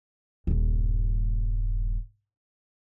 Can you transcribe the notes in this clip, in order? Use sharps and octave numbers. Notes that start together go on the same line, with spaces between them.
D#1 G2